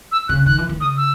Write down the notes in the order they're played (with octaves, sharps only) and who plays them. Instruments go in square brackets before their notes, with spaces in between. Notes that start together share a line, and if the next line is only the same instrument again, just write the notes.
[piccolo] E6
[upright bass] C#3 [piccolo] F#6
[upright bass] D#3 [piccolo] F#6
[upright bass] E3
D#3
[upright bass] C#3 [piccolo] D#6
[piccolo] E6